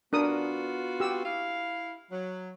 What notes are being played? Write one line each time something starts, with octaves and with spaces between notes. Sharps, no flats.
B3 D4 F4 F#4 A#4 D#6
G4 E6
E4 F5
F#3